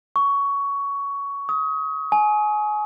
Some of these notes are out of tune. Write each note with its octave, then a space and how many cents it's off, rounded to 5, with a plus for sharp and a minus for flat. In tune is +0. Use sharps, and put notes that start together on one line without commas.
C#6 +15
D#6 +30
G#5 +25